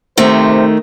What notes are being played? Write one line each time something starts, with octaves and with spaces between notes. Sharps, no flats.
C3 D#3 A3 C4 C5